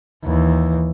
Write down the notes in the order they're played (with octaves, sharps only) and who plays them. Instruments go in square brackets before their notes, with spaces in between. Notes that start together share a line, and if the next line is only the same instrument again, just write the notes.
[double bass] D#2 E3